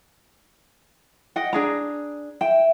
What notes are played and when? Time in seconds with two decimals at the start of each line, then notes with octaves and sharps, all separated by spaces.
1.36 D#5 F#5 G5
1.53 D4 G#4 A#5
2.41 E5 G5